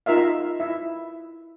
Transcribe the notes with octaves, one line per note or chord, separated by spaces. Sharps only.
D#4 F4 A#4 E5 F5
E4 E5